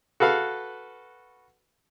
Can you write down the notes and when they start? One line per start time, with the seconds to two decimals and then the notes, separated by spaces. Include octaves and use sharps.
0.20 F#4 A4 B4 F5